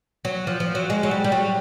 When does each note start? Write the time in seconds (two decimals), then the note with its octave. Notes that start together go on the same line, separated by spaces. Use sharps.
0.25 F#3
0.47 F3
0.60 F3
0.75 F#3
0.90 G#3
1.03 F#3
1.11 G3
1.24 G3
1.32 F#3